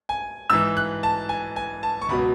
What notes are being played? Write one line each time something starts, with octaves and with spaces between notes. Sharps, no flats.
G#5
G#2 E3 E6
F#6
A5
G#5
G#5
A5
C#6
C#2 B2 F#3 B5